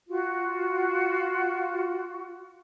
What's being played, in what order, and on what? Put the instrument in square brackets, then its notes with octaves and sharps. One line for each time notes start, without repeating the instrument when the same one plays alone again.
[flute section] F4 F#4